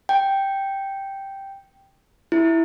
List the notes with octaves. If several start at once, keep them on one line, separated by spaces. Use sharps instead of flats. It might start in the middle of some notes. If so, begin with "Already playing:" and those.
G5
E4